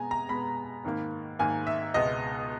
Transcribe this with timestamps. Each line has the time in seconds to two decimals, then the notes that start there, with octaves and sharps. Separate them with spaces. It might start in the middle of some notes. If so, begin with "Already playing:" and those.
Already playing: B2 G#3 B3 G#5 A#5
0.11 A#5
0.29 B2 G#3 B3 B5
0.85 G#2 D#3 A#3
1.39 G#2 D#3 A#3 G#5
1.67 E5
1.94 C#2 B2 G#3 B3 D#5